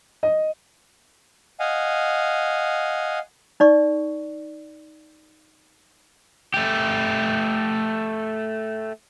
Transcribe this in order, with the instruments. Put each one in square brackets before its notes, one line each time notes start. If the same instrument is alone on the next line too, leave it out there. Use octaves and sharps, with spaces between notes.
[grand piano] D#5
[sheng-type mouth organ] D#5 F5 F#5 G#5
[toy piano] D#4 D5 C#6
[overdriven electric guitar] A3 G4